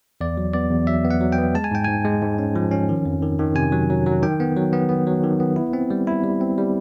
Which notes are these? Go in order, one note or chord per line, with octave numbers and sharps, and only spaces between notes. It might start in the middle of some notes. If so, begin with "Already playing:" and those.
E2 D5
F#3
B3 D5
E2
F#3 E5
B3
F#5
F#3
G5
B3
G#3 A5
G#5
G#2 G5
G#2 G#5
G#3
G#2
C#4
F3
C#4
D#3
F2
D#3
D#3
C3 G#5
F#3
F#3
F#3
D#3 G5
B3
F#3
B3
B3
F#3
D#3
B3
E4
C4
G3
E4
G3
C4
G3